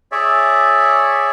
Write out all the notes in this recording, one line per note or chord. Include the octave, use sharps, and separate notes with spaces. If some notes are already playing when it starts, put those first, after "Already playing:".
G#4 C#5 D5 E5